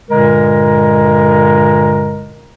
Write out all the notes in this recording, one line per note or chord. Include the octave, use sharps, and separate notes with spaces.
G2 A#2 D3 G#3 A#4 A#5